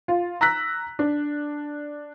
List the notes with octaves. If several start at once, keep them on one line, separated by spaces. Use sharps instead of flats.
F4
A#5 E6 F#6 B6
D4